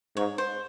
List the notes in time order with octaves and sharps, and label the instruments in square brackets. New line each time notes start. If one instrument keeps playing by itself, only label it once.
[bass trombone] G#2 [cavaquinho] C#5
[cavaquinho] C5